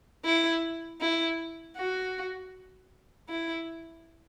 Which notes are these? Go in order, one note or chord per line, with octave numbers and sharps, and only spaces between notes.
E4
E4
F#4
E4